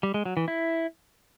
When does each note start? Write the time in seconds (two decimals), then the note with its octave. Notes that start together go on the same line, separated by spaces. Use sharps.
0.03 G3
0.14 G#3
0.25 F#3
0.37 E3
0.48 E4